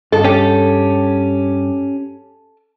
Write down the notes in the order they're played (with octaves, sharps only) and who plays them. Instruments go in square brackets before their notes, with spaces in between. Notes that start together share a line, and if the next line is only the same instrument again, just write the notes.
[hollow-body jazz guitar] G2 D#5 [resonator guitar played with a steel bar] A4
[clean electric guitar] C#4 G4